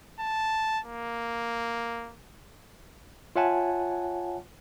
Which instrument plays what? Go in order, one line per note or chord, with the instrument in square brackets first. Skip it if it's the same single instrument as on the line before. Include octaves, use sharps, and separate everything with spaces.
[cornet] A5
A#3
[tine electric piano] F4 C#5 E5 F#5 G#5 A5